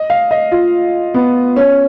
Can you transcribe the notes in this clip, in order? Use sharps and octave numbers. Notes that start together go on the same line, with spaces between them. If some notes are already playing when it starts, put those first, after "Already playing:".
Already playing: D#5
F5
D#5
F4
B3
C#4